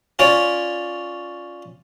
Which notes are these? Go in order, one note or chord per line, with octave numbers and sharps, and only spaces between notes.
C#4 F4 C#5 D5